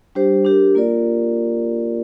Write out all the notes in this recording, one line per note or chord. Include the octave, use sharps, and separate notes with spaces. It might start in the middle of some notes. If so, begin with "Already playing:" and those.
G3 D4 G4 C5
D4 G4 A#4
A#3 F4 A#4 D5